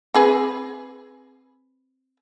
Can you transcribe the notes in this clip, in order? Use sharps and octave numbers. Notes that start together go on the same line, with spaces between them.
C4 G#4 B4